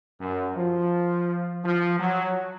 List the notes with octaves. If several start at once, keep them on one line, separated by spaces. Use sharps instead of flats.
F#2
F3
F3
F#3